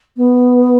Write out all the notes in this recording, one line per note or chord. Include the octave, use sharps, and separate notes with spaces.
B3